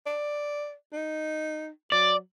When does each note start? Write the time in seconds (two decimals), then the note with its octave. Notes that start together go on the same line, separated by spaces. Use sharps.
0.06 D5
0.93 D#4
1.92 F#3 D5